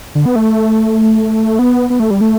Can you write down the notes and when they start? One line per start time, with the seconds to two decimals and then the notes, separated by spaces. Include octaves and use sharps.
0.15 D3
0.26 B3
0.36 A3
1.59 B3
1.90 B3
2.00 A3
2.11 G3
2.21 A3